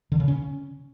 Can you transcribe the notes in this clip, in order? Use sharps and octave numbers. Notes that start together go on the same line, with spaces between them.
D3
C#3
C#4